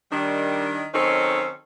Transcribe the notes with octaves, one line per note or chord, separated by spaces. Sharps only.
D#3 G3 D4
D#3 F#3 C4 C#4 D#4 A4